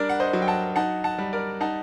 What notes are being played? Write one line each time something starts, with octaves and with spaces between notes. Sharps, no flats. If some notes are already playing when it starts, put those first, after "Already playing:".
Already playing: G3 D4 A#4 D5
F#5
C5 D#5
F#3
G5
F#5 A5
D#4 F#5 A5
F#5 A5
G3
A#4 D5
D#4 F#5 A5